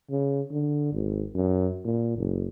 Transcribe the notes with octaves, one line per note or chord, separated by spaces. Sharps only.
C#3
D3
G#1
F#2
A#2
F#1